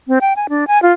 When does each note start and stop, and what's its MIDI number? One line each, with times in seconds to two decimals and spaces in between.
0.08 0.19 60
0.21 0.33 79
0.36 0.47 80
0.49 0.67 62
0.67 0.81 80
0.83 0.93 65